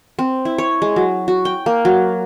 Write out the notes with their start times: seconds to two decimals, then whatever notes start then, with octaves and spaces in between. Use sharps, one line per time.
0.19 C4
0.45 E4
0.58 C#5
0.82 G#3
0.96 F#3
1.28 F#4
1.45 G5
1.66 A#3
1.85 F#3